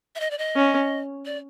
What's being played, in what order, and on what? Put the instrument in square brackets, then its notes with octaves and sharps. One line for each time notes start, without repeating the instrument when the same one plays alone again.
[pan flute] E5
D#5
D5
D#5
[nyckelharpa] C#4
[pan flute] D5